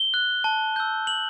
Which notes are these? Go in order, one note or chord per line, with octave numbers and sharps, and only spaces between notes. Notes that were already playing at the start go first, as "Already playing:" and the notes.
Already playing: G7
F#6
A5
E6 G6
A5 F#7